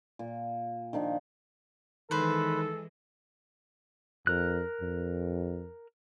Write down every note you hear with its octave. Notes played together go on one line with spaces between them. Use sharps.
A#2
D#3 F3 D4 D#4
D#3 E3 G#3 A4 B4 C5
F2 A#4 F#6
F2